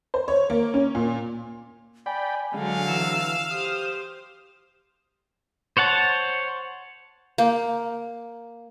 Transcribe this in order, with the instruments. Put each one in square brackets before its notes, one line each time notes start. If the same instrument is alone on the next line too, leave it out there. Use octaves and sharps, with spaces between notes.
[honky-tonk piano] C5
C#5
A#3
C#4
A#2
[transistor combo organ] D5 G5 B5 [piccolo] G#5
[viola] D3 F#3 [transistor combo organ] G#3 D4 [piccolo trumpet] F5
[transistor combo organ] E3 E6 [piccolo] E7
[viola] G4 C5 [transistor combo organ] D#6 F6
[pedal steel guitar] C5 C#5 F#5 A5
[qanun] A#3